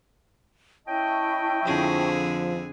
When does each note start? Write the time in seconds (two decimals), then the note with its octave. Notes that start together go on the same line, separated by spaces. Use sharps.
0.87 C#4 E4 D#5 G5 A5 C#6
1.65 F2 D3 F3 G#4